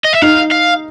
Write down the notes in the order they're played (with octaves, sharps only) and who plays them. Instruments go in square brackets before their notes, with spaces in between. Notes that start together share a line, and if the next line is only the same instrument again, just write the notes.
[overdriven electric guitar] D#5
E5
[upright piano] D#4 [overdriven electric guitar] F5
[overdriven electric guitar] F5